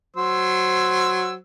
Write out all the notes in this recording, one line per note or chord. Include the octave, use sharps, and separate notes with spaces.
F#3 C5 E6